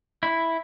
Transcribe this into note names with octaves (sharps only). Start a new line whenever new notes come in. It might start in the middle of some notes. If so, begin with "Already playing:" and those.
E4